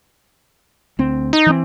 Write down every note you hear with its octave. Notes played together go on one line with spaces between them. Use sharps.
D2 C4
D#4
E3 C4